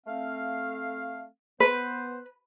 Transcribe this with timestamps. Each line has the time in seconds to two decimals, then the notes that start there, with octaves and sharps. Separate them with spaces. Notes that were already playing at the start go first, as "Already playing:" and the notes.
0.07 A3 C4 F5
1.60 B3 B4 C5